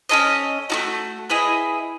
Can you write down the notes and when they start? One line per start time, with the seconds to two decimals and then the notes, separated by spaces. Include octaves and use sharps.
0.09 C#4 E4 A4 D#5
0.70 A3 D#4 F#4
1.29 B3 E4 G#4 D#5